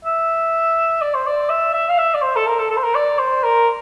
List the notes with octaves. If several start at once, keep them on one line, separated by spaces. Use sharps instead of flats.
E5
D5
C5
D5
E5
E5
F5
E5
D5
C5
A4
A#4
A4
A4
C5
A#4
D5
C5
A#4